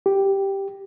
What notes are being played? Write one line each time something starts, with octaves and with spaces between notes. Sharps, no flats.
G4